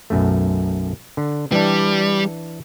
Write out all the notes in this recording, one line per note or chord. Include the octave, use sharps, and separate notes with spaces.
B1 F#2 A3
D3
E3 G3 D4